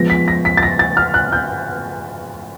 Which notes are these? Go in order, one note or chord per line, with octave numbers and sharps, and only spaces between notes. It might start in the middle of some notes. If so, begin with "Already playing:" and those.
Already playing: F3 G#3 B3 A#6
B6
A#6
B6
A6
A#6
A6
F6
F#6
G6